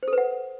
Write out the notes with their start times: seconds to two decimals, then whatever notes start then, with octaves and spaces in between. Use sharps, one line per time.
0.03 C5
0.08 A4
0.13 B4
0.18 F#5